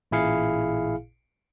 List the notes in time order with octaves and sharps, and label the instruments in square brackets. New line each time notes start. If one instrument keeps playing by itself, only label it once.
[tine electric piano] A1 A#2 E4 G#4 F5 C#7